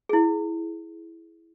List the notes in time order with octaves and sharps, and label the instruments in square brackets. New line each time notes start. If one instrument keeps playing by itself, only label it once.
[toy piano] E4 G#4